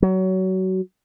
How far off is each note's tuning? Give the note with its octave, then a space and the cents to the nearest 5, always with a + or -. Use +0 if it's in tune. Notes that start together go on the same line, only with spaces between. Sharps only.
F#3 +25